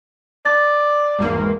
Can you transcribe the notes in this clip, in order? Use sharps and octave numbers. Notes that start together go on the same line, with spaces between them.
D5 A6
G#1 E2 A#3